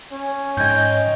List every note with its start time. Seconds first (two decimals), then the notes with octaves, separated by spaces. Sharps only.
0.12 C#4
0.57 G#2 C4 D#4 G6 G#6